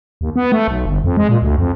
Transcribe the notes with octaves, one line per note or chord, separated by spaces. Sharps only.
D#2
B3
A3
B1
G1
F2
G#3
A#2
D2
F2